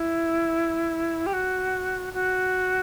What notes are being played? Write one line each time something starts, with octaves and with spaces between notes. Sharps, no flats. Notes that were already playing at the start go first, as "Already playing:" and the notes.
Already playing: E4
G4
F#4
F#4